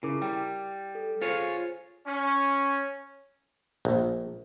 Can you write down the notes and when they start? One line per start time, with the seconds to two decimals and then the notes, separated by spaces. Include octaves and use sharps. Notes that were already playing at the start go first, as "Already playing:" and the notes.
0.03 C#3 E4 A#4 D6
0.22 G3 G5
0.95 A4
1.22 F4 G#4 C5 C#5
2.06 C#4
3.85 A#1